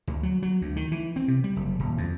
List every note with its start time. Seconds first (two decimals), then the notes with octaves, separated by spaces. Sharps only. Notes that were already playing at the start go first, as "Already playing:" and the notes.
0.08 D2
0.23 F#3
0.42 F#3
0.61 D2
0.76 D#3
0.92 E3
1.16 C4
1.28 C3
1.44 G3
1.56 F#1
1.80 D#1
1.98 F2